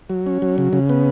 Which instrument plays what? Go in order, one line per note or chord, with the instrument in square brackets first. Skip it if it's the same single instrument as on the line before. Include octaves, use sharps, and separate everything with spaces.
[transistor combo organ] F#3
C#4
F#3
C#3
C#3
B3